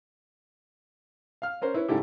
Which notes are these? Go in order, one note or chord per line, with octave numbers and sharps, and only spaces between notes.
F5 F6
C#4 A#4 C5
E4 B4 C#5
G#2 C#3 A3 E4 G4